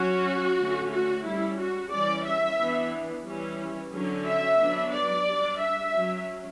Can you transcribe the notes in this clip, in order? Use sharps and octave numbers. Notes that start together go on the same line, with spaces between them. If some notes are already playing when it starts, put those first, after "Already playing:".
Already playing: F#3 C#4 F#4
D3 A3 C#4
F#4
G3 C#4 E4
F#4
E3 G3 C#4 D5
E5
E3 B3 D4
E3 G3 C#4
D3 F#3 C#4
E5
F#3 B3 D4
D5
G3 D4
E5
F#3 C#4